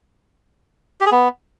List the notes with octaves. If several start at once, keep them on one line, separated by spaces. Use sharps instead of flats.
G4
G#4
B3